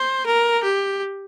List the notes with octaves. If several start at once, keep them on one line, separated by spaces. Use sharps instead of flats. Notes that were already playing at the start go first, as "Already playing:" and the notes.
Already playing: C5
A#4
G4